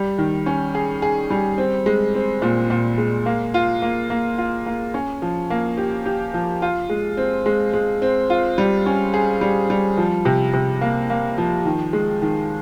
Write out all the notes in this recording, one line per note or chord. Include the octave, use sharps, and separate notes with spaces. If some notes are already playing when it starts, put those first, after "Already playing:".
Already playing: G3
D#3
C#4
G#4
G#4
G3
C4
G#3
C4
A#2
A#2
G#3
A#3
F4
A#3
A#3
F4
A#3
C#4
F3
A#3
G4
G4
F3
F4
G#3
C4
G#3
G#3
C4
F4
G3
C#4
G#4
G3
G3
F3
C3
C3
A#3
A#3
F3
D#3
G#3
D#3